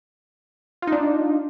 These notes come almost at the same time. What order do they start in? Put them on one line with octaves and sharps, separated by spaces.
F4 D#4 D4